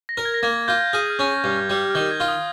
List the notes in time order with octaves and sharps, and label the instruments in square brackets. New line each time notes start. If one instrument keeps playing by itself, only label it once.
[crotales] A#6
[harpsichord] A#4
[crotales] G#6
A#6
[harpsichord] A#3 [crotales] G#6
[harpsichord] F4 [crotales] G6
[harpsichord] G#4 [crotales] F6
[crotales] F6
[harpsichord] C#4
G2
G3
[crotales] F6
[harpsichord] D#3 [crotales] G6
[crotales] G#6
[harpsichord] F4
[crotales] D#6